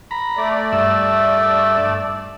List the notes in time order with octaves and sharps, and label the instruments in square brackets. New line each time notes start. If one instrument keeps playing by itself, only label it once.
[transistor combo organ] A#5 B5
[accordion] A3 D5
[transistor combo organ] G2 E5 E6